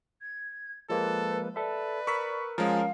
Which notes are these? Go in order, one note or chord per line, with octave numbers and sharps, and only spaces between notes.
G#6
F3 G#3 A#3 A4 B4
A4 B4 D5 E5
A#4 B5 C#6 E6 B6
F3 G#3 C#4 A#4 F5